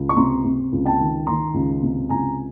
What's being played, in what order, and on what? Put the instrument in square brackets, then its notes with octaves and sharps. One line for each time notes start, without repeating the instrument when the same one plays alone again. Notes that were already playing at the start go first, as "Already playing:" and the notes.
Already playing: [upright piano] C#2
C#6
C3 A#5 C6
C3
C#2
G5 A5
D#3
D#3 A#5 C6
C#2
C3
C#2 G#5 A#5